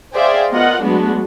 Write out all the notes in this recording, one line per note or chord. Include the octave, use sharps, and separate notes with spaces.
G#4 C5 D5 E5 F5 G5
B3 F4 A#4 D#5 F#5
F#3 G#3 A3 B3 D4 F#4